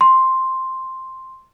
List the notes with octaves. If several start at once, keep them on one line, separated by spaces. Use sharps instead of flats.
C6